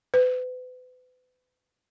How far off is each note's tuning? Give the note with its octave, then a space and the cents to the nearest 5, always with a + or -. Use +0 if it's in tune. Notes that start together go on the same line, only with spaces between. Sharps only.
B4 +40